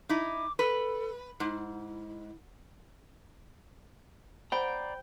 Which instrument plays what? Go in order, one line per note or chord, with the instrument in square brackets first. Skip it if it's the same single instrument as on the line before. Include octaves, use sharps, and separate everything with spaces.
[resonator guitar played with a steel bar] D#4 E4 [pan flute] D6
[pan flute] A4 [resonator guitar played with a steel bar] B4
[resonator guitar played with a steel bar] G#2 [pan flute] E4
[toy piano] C5 [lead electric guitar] D5 A#5 [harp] G5 [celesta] B5